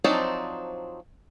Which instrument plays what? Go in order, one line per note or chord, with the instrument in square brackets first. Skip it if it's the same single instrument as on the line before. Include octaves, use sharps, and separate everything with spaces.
[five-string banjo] F3 F#3 C4 D4 D#4